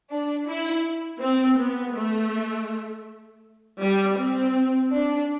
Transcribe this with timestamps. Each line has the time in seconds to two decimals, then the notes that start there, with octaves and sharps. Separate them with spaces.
0.10 D4
0.48 E4
1.21 C4
1.58 B3
1.96 A3
3.81 G3
4.18 C4
4.92 D4